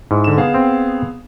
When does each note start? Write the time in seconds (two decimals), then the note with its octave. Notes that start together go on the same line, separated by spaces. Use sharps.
0.11 G#2 E4
0.24 D3 E7
0.37 B3 G#4 F5
0.54 C4